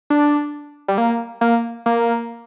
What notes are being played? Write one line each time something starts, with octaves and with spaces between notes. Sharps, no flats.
D4
G3
A#3
A#3
A#3